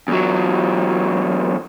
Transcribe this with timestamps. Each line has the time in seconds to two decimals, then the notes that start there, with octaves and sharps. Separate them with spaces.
0.08 E2 F#3